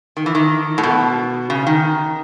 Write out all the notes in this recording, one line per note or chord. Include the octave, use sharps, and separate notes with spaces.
D#3
E3
D#3
A2
B2
C#3
D#3